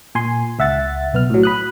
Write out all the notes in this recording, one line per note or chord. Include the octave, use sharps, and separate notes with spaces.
A#2 G#5 C6
C#2 E5 F#5 A6
B1 B3 F6
A2 F#3
B5 D#6 F#6